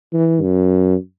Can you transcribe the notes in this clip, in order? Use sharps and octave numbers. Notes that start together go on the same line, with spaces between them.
E3
F#2